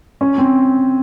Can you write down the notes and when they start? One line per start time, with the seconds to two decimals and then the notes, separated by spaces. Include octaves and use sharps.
0.21 C#4
0.38 C4